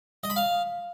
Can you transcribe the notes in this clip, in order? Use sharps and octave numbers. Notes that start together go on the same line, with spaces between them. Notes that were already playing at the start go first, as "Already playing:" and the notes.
D#5
B5
F5